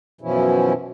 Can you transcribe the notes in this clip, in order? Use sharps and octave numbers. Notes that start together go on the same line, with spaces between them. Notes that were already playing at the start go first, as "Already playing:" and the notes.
F#2 B2 E3 F3 C#4 E4